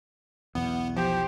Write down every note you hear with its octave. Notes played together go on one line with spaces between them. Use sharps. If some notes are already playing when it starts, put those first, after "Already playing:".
B1 E2 B3
F3 G4 C5